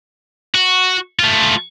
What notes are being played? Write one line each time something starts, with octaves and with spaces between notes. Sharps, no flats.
F#4
A3 F4